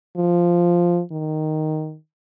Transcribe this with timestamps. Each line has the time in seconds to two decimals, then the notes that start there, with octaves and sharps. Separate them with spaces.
0.17 F3
1.11 D#3